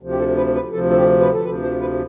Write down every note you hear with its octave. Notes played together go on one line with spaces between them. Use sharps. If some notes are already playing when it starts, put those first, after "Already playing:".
D2 C3 F3
G4
A4
B4
B4
D2 C3 F3 A4
A4
G4
B4
A4
D2 C3 F3 B4
C5
B4